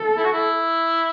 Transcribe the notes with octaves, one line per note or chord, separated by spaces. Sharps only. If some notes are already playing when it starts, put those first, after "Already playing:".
Already playing: A4
E4
F#4
E4